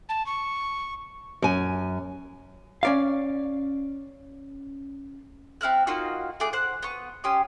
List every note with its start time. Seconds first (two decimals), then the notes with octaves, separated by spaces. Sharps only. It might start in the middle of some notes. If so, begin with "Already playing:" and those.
0.09 A5
0.26 C#6
1.42 F#2 G#5
2.83 C#4 D5 F5
5.61 C4 E4 F6 F#6
5.87 A#3 D#4 F4 F#4
6.40 A3 G#4 D6 F#6
6.53 C5 F#5 F#6
6.83 B3 C#6
7.24 C#4 G4 C6 D#6